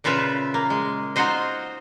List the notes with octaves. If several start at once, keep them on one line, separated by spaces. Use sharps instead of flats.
A#2 C#3 F4 B4 E5
A#3
G#3
D#4 F4 F#4 C5 D#5